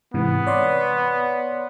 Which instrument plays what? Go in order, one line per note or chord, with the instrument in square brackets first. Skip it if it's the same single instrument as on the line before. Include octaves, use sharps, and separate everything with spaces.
[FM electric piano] G#2 C3 E3 [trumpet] B3
[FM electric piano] C#5 D5 C6